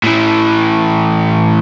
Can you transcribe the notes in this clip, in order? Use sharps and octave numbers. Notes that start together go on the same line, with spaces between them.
A2 E3